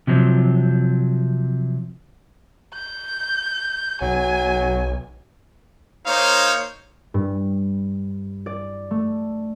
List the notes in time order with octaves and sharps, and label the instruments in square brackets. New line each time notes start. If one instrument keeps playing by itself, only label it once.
[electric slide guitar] C3 F3 F#3 C4
[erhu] G6
[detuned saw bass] B1 [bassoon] F#3 [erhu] G#5
[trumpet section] A#3 D#4 C5 C#5 F5
[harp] G2
D5
A3